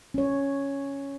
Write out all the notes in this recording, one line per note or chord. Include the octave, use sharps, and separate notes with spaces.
C#4 C#5